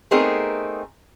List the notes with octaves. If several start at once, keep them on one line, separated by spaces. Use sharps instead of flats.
A3 B3 C4 D#4 G#4 A#4